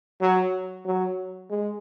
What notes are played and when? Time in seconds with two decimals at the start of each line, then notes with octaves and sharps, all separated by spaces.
0.21 F#3
0.85 F#3
1.50 G#3